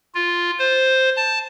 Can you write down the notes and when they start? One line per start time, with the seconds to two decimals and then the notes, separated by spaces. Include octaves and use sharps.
0.15 F4
0.59 C5
1.16 A5